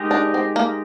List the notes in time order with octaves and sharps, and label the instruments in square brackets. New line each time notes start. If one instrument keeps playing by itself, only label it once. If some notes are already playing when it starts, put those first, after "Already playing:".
Already playing: [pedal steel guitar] G#3 D#4 G4 A#4 D#5
[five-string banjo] D4
C4
A#3